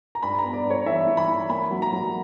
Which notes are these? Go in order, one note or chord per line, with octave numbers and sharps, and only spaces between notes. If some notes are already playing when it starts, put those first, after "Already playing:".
A#5
G2 B5
A#5
B3
D5
G2
C#5
E3 E5
E3
B5
E3
A#3 B5
F#3
A#5
F#3